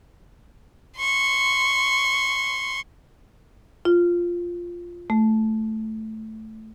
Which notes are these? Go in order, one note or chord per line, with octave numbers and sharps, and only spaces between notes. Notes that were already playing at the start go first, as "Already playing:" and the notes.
C6 C#6
F4
A3